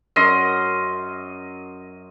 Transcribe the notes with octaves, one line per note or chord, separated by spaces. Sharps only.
F#2 D#5 C6